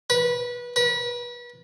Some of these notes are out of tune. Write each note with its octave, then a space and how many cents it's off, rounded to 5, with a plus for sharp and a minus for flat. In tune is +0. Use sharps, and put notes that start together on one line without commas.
B4 -25
B4 -35